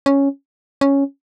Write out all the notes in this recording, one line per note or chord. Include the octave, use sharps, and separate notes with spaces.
C#4
C#4